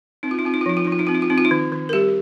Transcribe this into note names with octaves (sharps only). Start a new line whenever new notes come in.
C4 D#4
F4
D#4
C4 F4
D#4
F4
F3 D#4
F4
F3 D#4
F4
D#4
C4 F4
D#4
F4
C4 D#4
F4
D#4
D#3
D#3
A#4
G3 G4